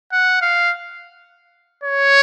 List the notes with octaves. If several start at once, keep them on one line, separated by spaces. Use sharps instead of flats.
F#5
F5
C#5